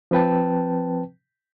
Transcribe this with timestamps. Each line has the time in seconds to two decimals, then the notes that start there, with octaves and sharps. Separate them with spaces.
0.11 F3 C4 B4 G5 A5